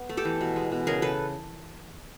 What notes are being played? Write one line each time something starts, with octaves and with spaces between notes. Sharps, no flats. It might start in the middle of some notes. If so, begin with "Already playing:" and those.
Already playing: B3
A3
G4 A4
E3
B2
G#3
B2
C#3 G#4 A#4
C#3 A4 B4